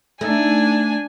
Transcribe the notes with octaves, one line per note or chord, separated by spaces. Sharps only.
A3 D4 D#4 G#5